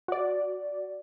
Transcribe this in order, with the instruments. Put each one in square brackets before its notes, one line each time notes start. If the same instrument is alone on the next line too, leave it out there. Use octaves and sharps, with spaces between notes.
[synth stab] F#4 D5